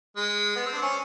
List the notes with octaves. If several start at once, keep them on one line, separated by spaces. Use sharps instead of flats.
G#3
B3
C4
D4
C#4